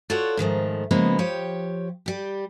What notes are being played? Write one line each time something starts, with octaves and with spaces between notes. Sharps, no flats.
F4 F#4 A4 C#5 D5 F#5
G#2 D#3 F3 A3
C#3 F3 G#3 A#3 B3
F3 G4 C#5 G5
G3 G4